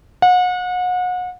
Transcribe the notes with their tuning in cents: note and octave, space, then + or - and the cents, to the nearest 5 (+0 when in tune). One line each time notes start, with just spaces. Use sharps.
F#5 -35